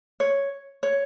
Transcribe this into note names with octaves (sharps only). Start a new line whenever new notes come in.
C#5
C#5